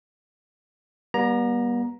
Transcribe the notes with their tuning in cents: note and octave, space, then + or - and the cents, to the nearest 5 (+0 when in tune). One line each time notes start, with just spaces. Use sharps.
G3 +0 B3 -40 A#5 +10